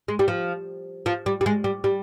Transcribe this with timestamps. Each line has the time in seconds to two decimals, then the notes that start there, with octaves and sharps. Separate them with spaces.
0.08 G#3
0.19 G3
0.28 F3
1.06 F3
1.26 G3
1.41 G3
1.46 G#3
1.64 G3
1.84 G3